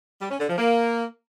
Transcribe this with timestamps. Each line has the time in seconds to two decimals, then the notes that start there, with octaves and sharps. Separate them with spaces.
0.21 G3
0.30 C#4
0.39 D3
0.49 F3
0.58 A#3